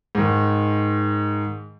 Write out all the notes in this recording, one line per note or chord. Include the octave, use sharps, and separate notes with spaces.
G#2 D#3